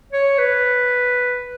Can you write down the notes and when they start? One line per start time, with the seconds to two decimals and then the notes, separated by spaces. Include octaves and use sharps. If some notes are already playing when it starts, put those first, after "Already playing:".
0.12 C#5
0.38 B4